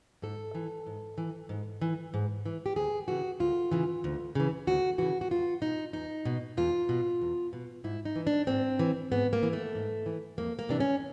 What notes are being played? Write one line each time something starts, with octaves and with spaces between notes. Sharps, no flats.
G#2 A4
E3
G#2
E3
G#2
E3
G#2
E3
G4
D2 G#4
C#3 E3 F#4
D2 F4
C#3 E3
D2
C#3 E3
D2 F#4
C#3 E3 F#4
F#4
E2 F4
B2 D#4
E2 D#4
B2
E2 F4
B2
E2
B2
G#2 E4
D#4
E3
D4
G#2 C4
E3
G#2 B3
A#3
E3
A3
G#2
E3
F2 A#3
A#3
C3 E3 D4
C#4